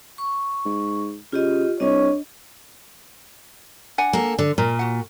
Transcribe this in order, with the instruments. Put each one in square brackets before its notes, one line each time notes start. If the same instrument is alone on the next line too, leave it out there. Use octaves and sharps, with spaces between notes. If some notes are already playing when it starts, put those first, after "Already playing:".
[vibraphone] C#6
[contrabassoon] G#2
[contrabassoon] C#3 [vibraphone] F4 G4 D#5
[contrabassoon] C2 [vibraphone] D4 D#5 [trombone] C#5
[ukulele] D4 F#5 G#5
[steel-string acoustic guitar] A#3 A4
D3
[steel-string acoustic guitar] A#2 [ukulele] A#4
[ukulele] F#4 F#5